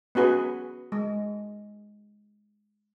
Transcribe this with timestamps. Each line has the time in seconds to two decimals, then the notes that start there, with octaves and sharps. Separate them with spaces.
0.15 B3 C#4 F#4 G#4 B4
0.92 G#3